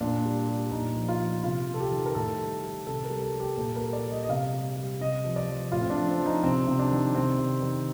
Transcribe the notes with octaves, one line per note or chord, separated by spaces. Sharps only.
A#2 D4
G3
G3
A#2 D#4
F3
F4
F3
C3 F4
C3
A4
G4
D#3
A#4
A2 A4
G3
G3
C3 A4
A#4
G3
A4
G3
G4
A#2 A4
A#4
G3
D5
G3
D#5
D#5
C3 F5
G3
G3
C3 D#5
F3
D5
F3
A2 F4
C4
D4
F3
C4
F3
D#4
C3 C4
C3
D4
D#3
C3 C4
C3
D#3